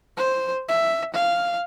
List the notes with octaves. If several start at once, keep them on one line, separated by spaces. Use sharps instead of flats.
C5
E5
F5